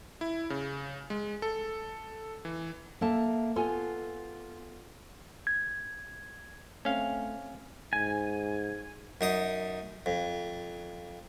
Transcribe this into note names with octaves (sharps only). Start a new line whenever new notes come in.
E4
C#3
G#3
A4
E3
A#3 A4 E5 A5
B3 F4 A4 G#5
G#6
A3 C4 C#4 F5
G#2 G#5
F#2 D#4 D#6
F2